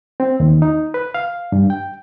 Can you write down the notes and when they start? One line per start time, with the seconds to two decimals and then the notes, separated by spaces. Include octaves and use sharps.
0.20 C4
0.40 D#2
0.62 D#4
0.94 B4
1.14 F5
1.52 G2
1.70 G5